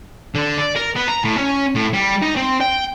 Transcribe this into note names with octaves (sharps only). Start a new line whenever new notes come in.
D3
D5
A#4
B3
A#5
A2
C#4
A2
G3
D#4
C4
G5